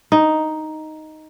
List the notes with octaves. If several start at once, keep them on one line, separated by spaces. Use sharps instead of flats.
D#4